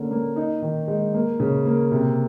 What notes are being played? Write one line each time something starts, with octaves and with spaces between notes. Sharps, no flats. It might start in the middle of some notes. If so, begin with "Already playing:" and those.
Already playing: D3 A#3 C#4
A#3
D#4
D#3
G#3
A#3
C#3
A#3
C3